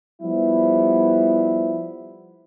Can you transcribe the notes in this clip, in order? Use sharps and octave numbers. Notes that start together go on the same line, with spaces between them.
F3 G3 B3 E4